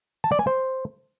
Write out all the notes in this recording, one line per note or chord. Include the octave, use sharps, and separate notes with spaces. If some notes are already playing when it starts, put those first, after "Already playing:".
A5
D5
G#5
C5